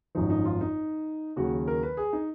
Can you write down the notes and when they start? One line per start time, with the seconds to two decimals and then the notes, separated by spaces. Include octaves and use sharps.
0.15 G#1 F#2 F3 D#4
0.30 D#4
0.45 F4
0.61 D#4
1.36 D#2 C#3 F#3 F#4
1.68 A#4
1.83 B4
1.97 G#4
2.13 D#4